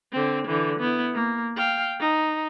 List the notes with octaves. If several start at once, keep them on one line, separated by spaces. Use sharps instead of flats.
D3 C4
D3 E3
B3 E4
A#3
F5 G5
D#4